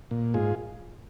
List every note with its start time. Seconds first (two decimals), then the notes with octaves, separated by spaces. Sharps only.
0.11 A#2
0.34 G#2 F4 G#4